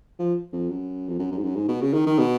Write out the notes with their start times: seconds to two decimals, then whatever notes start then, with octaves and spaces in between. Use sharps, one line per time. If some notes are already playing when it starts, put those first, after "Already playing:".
0.19 F3
0.53 F2
0.70 F#2
1.09 F2
1.19 F#2
1.32 F#2
1.38 G#2
1.44 F#2
1.56 G#2
1.68 B2
1.82 C#3
1.93 D#3
2.06 D#3
2.19 B2